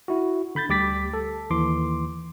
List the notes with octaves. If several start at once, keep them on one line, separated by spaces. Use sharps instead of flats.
E4 F#4
D3 B5 G6 A6
D2 G3 G4 D6 A6 B6
A4
D#2 E3 C6 D6